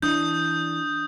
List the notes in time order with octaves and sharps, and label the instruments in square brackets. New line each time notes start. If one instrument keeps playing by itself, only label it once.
[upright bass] E3 [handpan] D4 [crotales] D#6 G6